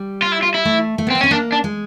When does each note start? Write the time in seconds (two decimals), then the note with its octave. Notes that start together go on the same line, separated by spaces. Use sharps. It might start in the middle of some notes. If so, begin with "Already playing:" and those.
Already playing: G3
0.22 F4
0.32 E4
0.43 F4
0.54 E4
0.65 A3
0.98 A3
1.07 B3
1.10 A#3 C4
1.21 C4 C#4
1.31 A#3 D4
1.52 D4
1.64 G#3